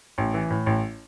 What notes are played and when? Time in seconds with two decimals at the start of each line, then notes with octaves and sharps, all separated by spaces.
0.18 A1
0.34 E3
0.50 A2
0.66 A1